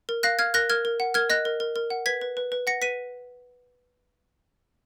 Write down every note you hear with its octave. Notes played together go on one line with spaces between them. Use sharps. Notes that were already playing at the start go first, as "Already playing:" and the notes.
A#4
F5 F#6 A#6
F5 F6 G#6
A#4 F#6 A#6
A#4 F6 G#6
A#4
F#5
A#4 F6 G#6
D#5 F#6 A#6
A#4
A#4
A#4
F#5
B4 G#6 B6
B4
B4
B4
F#5 A#6 C#7
B4 B6 D#7